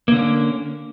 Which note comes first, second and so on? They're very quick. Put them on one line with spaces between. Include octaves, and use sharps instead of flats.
A#3 D3 C#4